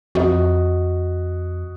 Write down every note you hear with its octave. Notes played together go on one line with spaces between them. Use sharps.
F2 F#4 D#5